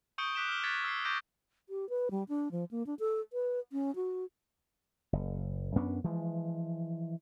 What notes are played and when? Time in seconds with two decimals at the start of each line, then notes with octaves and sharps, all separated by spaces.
0.18 C#6 D#6 G6 C#7 D7 G7
0.34 D6 F#6 B6 D7 E7 G7
0.49 F6 G7
0.64 F#6 G#6 A6 B6 C#7
0.84 E6 C7
1.05 C#6 D6 G6 A#6 D7
1.69 G4
1.89 B4
2.11 G3
2.29 D4
2.52 F3
2.71 A#3
2.87 D4
2.99 A4
3.33 B4
3.72 C#4
3.96 F#4
5.13 F#1
5.76 F#2 B3 C#4 D4
6.04 E3 F3 G#3